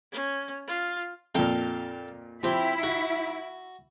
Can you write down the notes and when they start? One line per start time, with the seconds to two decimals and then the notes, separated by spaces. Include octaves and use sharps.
0.12 C#4
0.67 F4
1.35 F2 A#2 A4 F5 G5
2.43 F3 C4 E4 G4
2.83 F#4